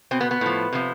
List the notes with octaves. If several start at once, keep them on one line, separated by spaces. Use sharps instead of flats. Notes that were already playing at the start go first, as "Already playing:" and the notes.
B2 C4
B3
B3
A2 F3
C3 F3